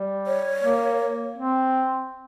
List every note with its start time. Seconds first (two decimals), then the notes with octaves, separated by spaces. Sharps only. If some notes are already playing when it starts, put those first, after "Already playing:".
Already playing: G3
0.27 C#5
0.64 A#3
1.38 C4